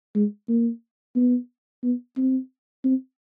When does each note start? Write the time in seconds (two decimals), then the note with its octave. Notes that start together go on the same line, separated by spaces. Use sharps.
0.15 G#3
0.49 A#3
1.16 B3
1.83 B3
2.17 C4
2.84 C4